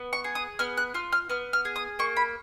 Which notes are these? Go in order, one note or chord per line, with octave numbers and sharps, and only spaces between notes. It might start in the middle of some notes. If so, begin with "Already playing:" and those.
Already playing: B3
C#6
G#4
D#6
B3 F6
F#6
F4 F6
F6
B3 F6
F6
G#4
D#6
A#3 C#6
B5